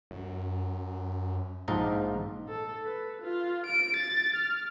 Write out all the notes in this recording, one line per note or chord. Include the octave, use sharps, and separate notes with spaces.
F#2
A#1 G#2 D#4 F4 A5 A#5
A4
B4
F4
D7
A6
F6